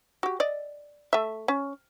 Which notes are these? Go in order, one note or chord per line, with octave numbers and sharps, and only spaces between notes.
F#4 G4
D5 D#5
A3 E5
C#4